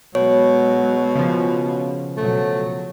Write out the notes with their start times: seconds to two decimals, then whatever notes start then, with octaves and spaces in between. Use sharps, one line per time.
0.15 B2 F#3 G#3 C#5
1.15 C#3 F3
2.17 B2 F#3 A3